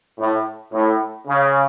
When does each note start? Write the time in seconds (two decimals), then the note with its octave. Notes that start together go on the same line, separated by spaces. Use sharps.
0.18 A2
0.73 A2
1.28 C#3